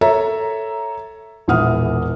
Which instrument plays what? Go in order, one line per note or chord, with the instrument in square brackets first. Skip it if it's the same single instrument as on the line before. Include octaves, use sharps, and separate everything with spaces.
[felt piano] A4 C#5 E5 A#5
E1 A#1 E3 F#5 D#6 F6